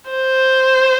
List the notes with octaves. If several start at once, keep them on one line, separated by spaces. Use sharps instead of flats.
C5